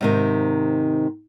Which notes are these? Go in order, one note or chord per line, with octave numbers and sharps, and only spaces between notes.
G#2 C3 D#3